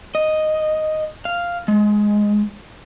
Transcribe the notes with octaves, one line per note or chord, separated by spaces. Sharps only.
D#5
F5
G#3